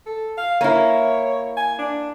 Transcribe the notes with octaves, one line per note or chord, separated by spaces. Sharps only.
A4
F5
A#3 E4 C#5
G#5
D4